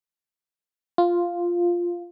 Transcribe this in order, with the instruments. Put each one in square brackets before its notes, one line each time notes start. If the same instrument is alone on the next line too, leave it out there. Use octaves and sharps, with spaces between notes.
[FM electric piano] F4